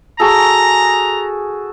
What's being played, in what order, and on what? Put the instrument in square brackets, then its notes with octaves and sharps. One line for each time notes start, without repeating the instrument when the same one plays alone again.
[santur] F#4 G#4 A4 [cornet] A#5